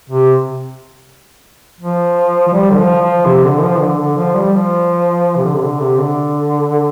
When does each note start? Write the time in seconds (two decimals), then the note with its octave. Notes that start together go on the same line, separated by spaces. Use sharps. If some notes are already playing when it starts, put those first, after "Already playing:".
0.10 C3
1.80 F3
2.49 F3
2.53 G3
2.71 D3
2.77 F3
3.01 F3
3.26 C3
3.44 D3
3.62 F3
3.80 D3
3.98 D3
4.17 F3
4.35 G3
4.53 F3
5.36 C3
5.44 D3
5.55 C3
5.63 D3
5.81 C3
5.99 D3